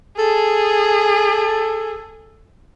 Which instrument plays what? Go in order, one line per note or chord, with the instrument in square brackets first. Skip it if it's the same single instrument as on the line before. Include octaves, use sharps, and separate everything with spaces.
[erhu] G#4 [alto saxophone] A4